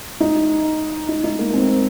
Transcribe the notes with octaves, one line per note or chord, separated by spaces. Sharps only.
D#4
D#4
D#4
A#3
C4